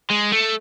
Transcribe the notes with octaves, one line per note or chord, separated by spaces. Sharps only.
G#3
A3